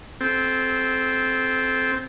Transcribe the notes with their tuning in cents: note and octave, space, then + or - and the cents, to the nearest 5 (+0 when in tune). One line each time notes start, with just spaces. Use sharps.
C4 +0 A4 -25